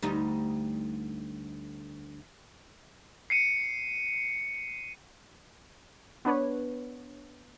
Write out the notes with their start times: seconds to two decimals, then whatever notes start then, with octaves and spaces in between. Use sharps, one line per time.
0.02 D2 G3 D#4
3.30 C7 C#7 D#7
6.25 B3 D4 B4 C#5